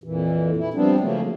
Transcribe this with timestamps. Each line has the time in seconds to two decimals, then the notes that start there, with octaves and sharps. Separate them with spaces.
0.04 F2 A#2 E3
0.57 E4
0.74 F3 G3 B3 C4 D4
1.00 C#3 F3 F#3 A3 A#3